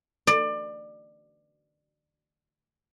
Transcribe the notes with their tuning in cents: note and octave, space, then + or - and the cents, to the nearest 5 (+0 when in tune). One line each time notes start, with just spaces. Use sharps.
D5 +25